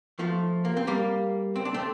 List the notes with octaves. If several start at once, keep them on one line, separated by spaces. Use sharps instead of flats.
F3 A3
A#3
C4
G3 A#3
C4
D4
A3 C4